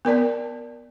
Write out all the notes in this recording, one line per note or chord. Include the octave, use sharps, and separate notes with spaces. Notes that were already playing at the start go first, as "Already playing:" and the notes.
B3 A#4 D5 A5